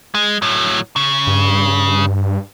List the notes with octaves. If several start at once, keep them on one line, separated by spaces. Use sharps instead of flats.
G#3
A2 F#3
C#3
G2